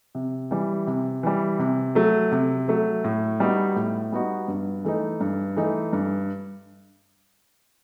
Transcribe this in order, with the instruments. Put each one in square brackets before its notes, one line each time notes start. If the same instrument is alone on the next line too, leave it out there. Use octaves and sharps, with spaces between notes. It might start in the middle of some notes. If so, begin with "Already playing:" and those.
[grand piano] C3
E3 G3
C3
E3 G3
C3
F#3 A3
C3
F#3 A3
A2
G3 B3 D#4 F#4
A2
G3 B3 D#4 F#4
G2
E3 A3 D#4
G2
E3 A3 D#4
G2